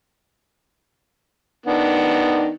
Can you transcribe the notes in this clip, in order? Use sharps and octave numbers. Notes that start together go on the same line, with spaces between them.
D#3 B3 D4